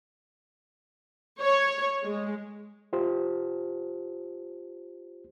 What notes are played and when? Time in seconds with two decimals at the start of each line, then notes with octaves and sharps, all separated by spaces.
1.39 C#5
2.03 G#3
2.93 F4 G4 C5